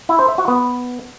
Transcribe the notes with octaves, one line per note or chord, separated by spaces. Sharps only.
E4
C5
E5
F#4
B3